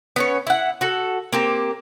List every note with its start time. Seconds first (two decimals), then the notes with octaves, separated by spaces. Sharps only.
0.16 B3 C#4 C#5
0.47 E4 F#5
0.81 F#4 A4
1.32 A#3 C4 G4